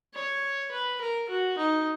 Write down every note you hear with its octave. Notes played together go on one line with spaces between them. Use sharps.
C#5
B4
A#4
F#4
D#4